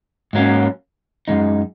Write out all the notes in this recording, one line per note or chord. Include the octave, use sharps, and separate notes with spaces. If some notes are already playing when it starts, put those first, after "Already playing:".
G#2 F#3 A#3 C#4
F#2 C#3 G#3 D#4